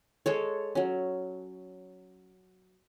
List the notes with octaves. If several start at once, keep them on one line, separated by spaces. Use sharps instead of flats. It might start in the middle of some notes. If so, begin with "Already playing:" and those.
G#3 A4 C#5
F#3 C#4